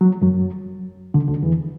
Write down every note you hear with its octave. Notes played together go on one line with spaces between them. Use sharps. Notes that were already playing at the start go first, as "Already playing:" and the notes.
F#3
F#2 F#3
D2 D3
D2 D3
E2 E3